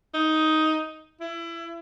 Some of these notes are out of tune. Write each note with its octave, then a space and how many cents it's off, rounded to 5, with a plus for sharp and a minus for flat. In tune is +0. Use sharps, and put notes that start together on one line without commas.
D#4 +10
E4 +25